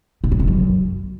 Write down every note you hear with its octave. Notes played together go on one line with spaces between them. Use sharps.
B2
C#3
C3
F#2